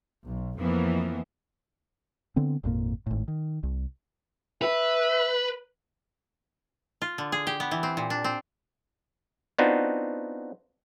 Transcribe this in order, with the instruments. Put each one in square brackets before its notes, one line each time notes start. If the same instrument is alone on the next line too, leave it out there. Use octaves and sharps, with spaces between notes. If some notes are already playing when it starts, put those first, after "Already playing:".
[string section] B1
F2 E3 F3 A#3 B3
[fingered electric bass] D3 B3 C4
G#1 F2 A#2 A#3
G#1 A2
D#3
C2
[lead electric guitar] B4 [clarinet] E5
[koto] F4
D3
G#4
G4
B3
E3
C4
A#2
D4
C4
[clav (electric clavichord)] B3 C4 D4 D#4 F4 F#4